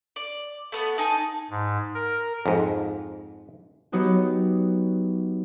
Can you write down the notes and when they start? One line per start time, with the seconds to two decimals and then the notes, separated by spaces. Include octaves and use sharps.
0.16 D5
0.72 A3 B3 F#5
0.98 D#4 G#5 A5
1.50 G#2
1.94 A#4
2.46 F2 G#2
3.92 F#3 B3 D#4 F#4 G4